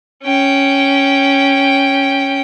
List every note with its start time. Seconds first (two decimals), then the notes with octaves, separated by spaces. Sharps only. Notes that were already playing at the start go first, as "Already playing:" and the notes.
0.23 C#4 G5